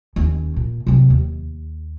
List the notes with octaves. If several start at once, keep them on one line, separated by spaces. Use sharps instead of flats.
D#2 C#4
A#2
C3 F#3
D#2